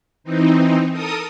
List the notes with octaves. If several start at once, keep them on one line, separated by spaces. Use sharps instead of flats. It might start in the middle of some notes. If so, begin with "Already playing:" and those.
E3 C4 D#4
A4 A#4 D#6